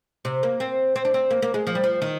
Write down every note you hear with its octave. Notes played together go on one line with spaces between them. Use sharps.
C3
A#3
C4
C4
D4
C4
A#3
A#3
G#3
F3
G3
F3
D#3